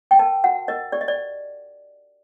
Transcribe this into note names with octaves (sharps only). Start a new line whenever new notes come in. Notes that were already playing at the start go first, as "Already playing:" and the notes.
G5
A#4 A5
F#4 F#5
A#4 D#5
G4 D5
D#5
D5